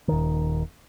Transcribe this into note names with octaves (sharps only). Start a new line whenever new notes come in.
D#1 D#3